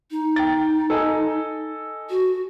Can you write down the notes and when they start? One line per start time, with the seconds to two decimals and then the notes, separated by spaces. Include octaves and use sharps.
0.11 D#4
0.36 G5 A6
0.90 A4 D#5 G#5
2.10 F#4